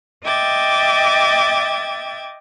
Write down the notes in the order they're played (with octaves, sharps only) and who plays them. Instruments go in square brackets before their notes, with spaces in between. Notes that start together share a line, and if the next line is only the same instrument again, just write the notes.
[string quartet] D#5 E5 G5 D6 G#6 A6